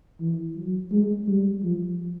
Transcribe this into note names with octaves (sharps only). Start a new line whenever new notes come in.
E3
F#3
G#3
G3
F3